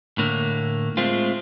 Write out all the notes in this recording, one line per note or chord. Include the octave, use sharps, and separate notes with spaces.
A2 D3 A#3
G#3 A3 C4 F4